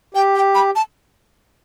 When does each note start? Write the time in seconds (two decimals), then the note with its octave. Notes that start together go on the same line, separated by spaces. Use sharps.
0.15 G4 G5
0.35 G5
0.55 B5
0.76 A5